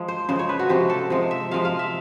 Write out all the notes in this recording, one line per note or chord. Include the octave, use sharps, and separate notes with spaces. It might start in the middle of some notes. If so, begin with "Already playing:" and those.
Already playing: F3 G#3
C5
C#3 F3 G#3 C5
C#5
B4
F#4
C3 F3 G#3 G4
A4
C3 F3 G#3
E5
C3 F3 G#3 F5
F5
E5